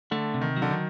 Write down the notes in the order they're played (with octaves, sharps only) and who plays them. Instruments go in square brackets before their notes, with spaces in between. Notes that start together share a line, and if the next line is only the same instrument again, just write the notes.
[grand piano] D3 [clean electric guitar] A3
[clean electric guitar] C3
[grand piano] D#3
[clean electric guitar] F#3
[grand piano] D3
D#3